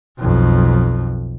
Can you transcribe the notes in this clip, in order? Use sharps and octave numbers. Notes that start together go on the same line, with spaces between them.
B1 F2